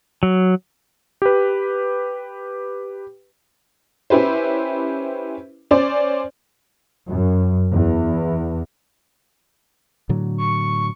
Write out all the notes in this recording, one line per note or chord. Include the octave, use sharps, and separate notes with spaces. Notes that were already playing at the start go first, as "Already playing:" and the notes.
F#3
G4 B4
C#4 E4 G4 B4 C5
C#4 C5 D5
F#2
E2
A2 D3 F#3
C#6